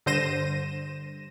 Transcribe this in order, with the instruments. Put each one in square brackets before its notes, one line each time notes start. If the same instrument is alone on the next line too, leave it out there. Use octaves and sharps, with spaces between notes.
[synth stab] G2 D3 C5 A#6 D#7 E7